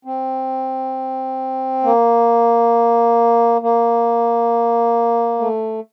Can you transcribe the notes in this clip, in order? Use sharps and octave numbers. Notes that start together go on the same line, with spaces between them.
C4
A#3
A#3
A3